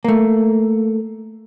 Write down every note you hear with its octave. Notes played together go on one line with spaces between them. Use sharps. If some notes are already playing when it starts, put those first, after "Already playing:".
A3 A#3